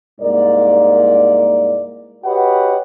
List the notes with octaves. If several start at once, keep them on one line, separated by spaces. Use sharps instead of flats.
C2 G#2 A#3 A#4 D5
F#4 G4 B4 C#5 D#5 F#5